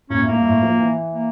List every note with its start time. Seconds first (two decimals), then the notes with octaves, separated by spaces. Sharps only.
0.10 A#2 C#4
0.22 A2
0.28 A#3
0.34 G2
0.45 A2
0.62 F3
0.79 E3
1.13 A#3